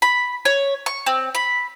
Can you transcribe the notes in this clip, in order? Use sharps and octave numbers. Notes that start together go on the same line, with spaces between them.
B5
C#5
C#6
C4
B5